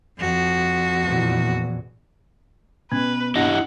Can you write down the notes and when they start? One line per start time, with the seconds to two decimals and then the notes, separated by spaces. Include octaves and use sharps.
0.18 F2 F#4
1.02 E2 A#2 E3
2.92 B2 C#4 B4
3.36 D4 E4 G4 D#5 F#5